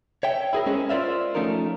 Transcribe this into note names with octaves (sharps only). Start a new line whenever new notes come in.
C#5 E5 G5
E4 G#4 A#4
G#3 C#4 G#4 C5 C#5 D#5
F4 A#4 C5 D5 E5 F5
F3 A3 C#4 D#4 F4 A#4